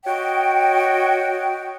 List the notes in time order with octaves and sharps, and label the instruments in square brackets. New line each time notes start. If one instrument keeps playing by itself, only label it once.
[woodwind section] F#4 C#5 D#5 G5